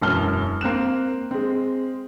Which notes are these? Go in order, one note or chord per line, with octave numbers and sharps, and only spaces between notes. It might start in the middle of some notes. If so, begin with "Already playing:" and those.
E1 F#2 E3 A5 F6 G7
A#3 C4 F#6 E7
G#3 C4